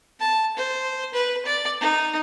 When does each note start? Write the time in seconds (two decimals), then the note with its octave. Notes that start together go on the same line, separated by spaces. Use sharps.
0.20 A5
0.57 C5
1.14 B4
1.45 D5
1.81 D#4